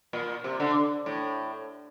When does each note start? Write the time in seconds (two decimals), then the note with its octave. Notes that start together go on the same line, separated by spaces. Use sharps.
0.13 A#2
0.44 C3
0.60 D3
1.06 A2